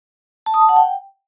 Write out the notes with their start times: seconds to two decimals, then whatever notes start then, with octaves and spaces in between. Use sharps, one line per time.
0.46 A5
0.54 D#6
0.61 A5
0.69 F#5
0.77 G5